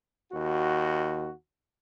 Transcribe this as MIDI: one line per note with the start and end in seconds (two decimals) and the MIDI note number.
0.32 1.30 39
0.32 1.30 66